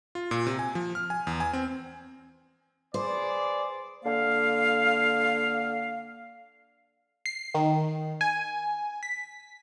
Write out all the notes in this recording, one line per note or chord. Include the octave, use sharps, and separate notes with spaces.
F4
A#2
C3
G#5
F3
F6
G#5
E2
G#5
C4
G#4 B4 C5 D5
D3 A#3 F5
C7
D#3
G#5
B6